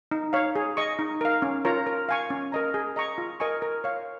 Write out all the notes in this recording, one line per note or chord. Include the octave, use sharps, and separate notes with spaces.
D#4
C#5 F5
G#4
D#5 C#6
D#4
A#4 F5
C#4
F4 A#4 C#5 A#5
A#4
F5 G#5 C#6
C#4
A#4 D#5 A#5
G#4
D#5 A#5 C#6
F4
A#4 D#5 G#5 C#6
A#4
C#5 F5